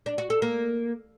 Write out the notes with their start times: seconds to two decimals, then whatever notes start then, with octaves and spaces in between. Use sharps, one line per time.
0.06 D4
0.18 F#4
0.30 A4
0.42 A#3